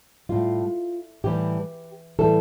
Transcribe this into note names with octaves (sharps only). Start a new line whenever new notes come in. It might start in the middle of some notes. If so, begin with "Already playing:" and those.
A2 G3 F4
A2 E3 G3 G4
A2 E3 G3 A4